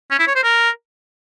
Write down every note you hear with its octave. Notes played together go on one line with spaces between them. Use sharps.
C#4
E4
C#5
C5
A#4